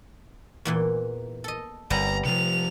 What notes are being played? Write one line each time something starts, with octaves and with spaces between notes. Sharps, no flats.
E2 A#2 E3
A4 D#5
G1 G3 B3 C4 A#5
C3 D#3 F3 F7